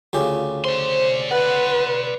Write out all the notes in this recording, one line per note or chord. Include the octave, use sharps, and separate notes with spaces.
D2 C#3 F4 G4
C5 D5 C6
B4 F#5